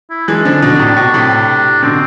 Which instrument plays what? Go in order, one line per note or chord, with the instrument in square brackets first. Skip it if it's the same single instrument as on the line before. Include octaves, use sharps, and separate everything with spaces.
[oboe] E4
[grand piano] E3 G#3 [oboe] D4
[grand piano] D3 F3
B2 D3
A2 C3
B2
A2 C3
[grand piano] B2 D3 [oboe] C4